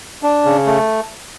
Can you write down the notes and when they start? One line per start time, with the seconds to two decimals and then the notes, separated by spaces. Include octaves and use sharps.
0.23 D4
0.45 C#3
0.66 A3